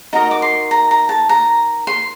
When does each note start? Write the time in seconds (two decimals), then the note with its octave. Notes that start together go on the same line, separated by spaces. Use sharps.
0.13 D#4 F#4 A#4 D#5 A#5
0.31 D6
0.42 C6
0.71 A#5
0.91 A#5
1.09 A5
1.29 A#5
1.87 C6